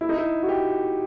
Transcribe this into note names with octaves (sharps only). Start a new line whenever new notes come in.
E4
D#4
E4
F#4
G4